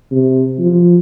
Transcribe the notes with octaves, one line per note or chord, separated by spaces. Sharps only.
C3
F3